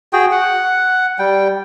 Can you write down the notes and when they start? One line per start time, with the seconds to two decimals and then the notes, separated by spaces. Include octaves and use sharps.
0.13 F#4 G#4 G5
0.31 F#5
1.19 G3 G5